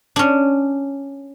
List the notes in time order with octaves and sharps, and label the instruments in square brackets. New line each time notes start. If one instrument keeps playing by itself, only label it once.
[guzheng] C#4 D4